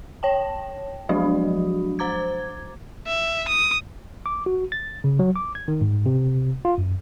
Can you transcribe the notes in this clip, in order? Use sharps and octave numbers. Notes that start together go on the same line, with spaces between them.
C#5 G5 A5
F3 F#3 G#3 D4 F#4
C5 A#5 D6 G#6
E5
D#6
D6
F#4
A6
C#3
F#3
D6
G#6
D#3
G#2
C3
F4
F#2